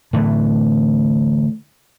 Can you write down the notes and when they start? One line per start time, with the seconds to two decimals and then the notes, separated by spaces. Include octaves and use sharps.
0.13 A2 D3 E3